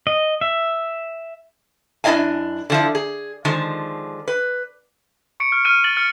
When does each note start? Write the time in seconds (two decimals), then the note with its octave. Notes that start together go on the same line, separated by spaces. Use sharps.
0.07 D#5
0.41 E5
2.04 F#2 D4 E4 D#5 F5 G#5
2.70 D3 F3 E4
2.95 G#4
3.45 D3 D#3 F3 G#3
4.28 B4
5.40 C#6 C#7 D7
5.52 F6
5.65 F6 D#7
5.84 A6 D#7 F#7 G7
5.97 F6 C#7